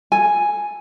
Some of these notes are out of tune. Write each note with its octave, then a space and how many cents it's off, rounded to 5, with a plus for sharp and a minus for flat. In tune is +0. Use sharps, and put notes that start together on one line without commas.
A4 +0 G#5 +0